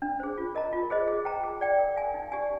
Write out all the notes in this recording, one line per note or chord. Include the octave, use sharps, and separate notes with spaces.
D4
G#4 C5
F4
A#4 D#5 A#5
F4
G#4 C5 D#5
G#4
C5 G5 A#5
G#4
D5 G5
A#4
F5 G#5
D#4
G4 D5 G#5